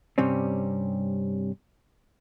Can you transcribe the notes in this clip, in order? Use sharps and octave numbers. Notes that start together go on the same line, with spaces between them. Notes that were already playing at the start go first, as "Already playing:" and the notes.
G2 C3 G3 C4 C#4